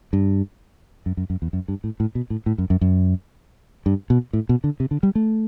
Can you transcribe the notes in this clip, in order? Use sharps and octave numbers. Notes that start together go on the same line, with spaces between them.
G2
F#2
F#2
F#2
E2
F#2
G2
A2
A2
B2
A2
A2
F#2
F#2
F#2
G2
B2
A2
B2
D3
C3
D3
G3
A3